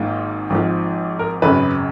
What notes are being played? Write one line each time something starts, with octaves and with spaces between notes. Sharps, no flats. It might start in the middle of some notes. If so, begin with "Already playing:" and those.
Already playing: G#1 G#2 D#3 A#3 F4
G#1 G#2 F3
A#4
G#1 F#2 C#3 B4